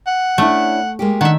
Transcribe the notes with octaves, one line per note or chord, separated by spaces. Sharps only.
F#5
A3 C#4 D4 E4
G#3 A#3 G4
D#3 D4 E5 F#5